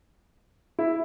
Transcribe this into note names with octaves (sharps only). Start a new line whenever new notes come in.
E4